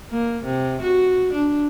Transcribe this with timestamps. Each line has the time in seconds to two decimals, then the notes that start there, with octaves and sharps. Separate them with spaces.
0.11 A#3
0.44 C3
0.82 F#4
1.33 D4